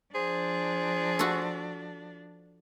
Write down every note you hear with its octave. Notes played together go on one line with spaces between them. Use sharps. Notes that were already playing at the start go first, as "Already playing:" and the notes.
F3 D4 G#4 C5
F#4 A4